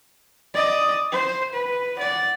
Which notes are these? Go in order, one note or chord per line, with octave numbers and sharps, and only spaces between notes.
D5 D#5
C5
B4
D5 F#5